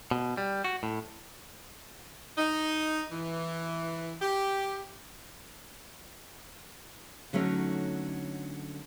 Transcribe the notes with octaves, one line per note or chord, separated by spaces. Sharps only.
B2
G3
F#4
A2
D#4
E3
G4
D3 F#3 A3 C#4 D#4